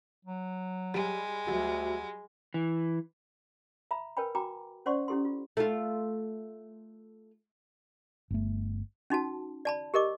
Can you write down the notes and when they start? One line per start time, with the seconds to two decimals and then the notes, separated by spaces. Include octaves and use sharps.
0.25 F#3
0.94 G3 G#3 G4
1.47 D2 F#3 G3
2.54 E3
3.91 E5 A#5 B5
4.17 A#4 B4 C#5 G5 G#5 B5
4.35 F#4 G5 G#5 A#5 B5 D6
4.86 C#4 C5 D5 F#5 C6 C#6
5.08 C#4 E4 G4 A4 C6
5.25 F4
5.57 A3 F4
8.30 G1 A3
9.10 C#4 D#4 F#4 A5
9.65 D5 A5 B5
9.94 G4 A#4 D#5 D6